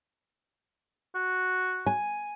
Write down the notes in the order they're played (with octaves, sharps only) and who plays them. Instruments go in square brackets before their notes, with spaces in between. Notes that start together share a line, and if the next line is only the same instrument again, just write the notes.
[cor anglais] F#4
[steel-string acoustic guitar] G#5